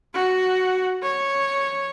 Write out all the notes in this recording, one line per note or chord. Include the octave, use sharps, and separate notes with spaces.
F#4
C#5